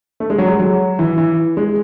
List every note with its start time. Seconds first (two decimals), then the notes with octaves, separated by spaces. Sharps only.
0.20 A3
0.30 G#3
0.38 F#3
0.48 G#3
0.59 F#3
0.99 E3
1.18 E3
1.57 G#3